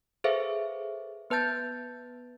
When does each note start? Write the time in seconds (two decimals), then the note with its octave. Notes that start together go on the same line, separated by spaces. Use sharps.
0.24 G#4 A4 B4 C5 E5 F5
1.30 B3 B4 A5 G6 A6